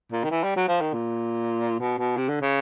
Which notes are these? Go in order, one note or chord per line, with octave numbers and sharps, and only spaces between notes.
A#2
D#3
E3
G3
F#3
F3
D#3
A#2
B2
B2
C3
D3
C#3